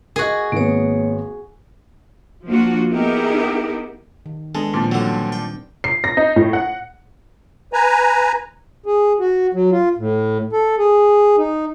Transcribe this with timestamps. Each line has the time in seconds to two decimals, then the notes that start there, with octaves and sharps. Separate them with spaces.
0.16 F#4 G#4 A#4 D#5
0.52 G#1 A#3 B3 C#5
2.47 F3 A#3 D4 F4 F#4
2.92 B3 D#4 E4 G4 G#4 A#4
4.26 D#3
4.55 G#3 B3 D4 A4
4.74 A#2 D#3 F3 C4
4.92 D3 F#3 G3
5.32 G5
5.84 C7
6.04 A#6
6.17 D#4
6.36 A2
6.53 F#5
7.73 B4 G#5 A#5
8.86 G#4
9.19 F#4
9.53 F#3
9.71 F4
9.98 A2
10.53 A4
10.78 G#4
11.38 D#4